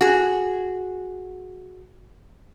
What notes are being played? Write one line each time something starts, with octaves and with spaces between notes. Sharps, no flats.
F#4 G#4